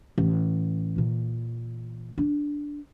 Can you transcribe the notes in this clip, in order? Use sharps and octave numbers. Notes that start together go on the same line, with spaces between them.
A1
A#2 E3
D4